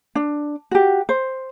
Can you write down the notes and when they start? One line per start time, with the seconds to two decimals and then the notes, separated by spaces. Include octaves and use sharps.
0.15 D4
0.71 F#4 G4
1.09 C5